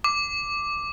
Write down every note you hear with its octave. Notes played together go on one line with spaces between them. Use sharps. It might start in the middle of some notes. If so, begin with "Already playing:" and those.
D6